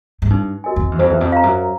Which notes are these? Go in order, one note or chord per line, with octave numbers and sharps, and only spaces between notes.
G#2
G2 D#4
F#4 A#4 D#5 G#5
F2
E2
F2 C5
E2
F2
F5 A#5
F#2